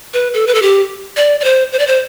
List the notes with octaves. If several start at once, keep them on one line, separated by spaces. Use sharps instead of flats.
B4
A4
B4
A4
G4
D5
D5
C5
C5
D5
C5